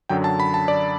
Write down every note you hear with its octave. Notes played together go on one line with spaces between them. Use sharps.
F#2 D3 F#3 G5
A5
B5
A5
D5